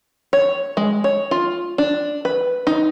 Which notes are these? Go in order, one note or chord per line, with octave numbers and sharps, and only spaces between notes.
C#5
G#3
C#5
F4
D4
B4
D#4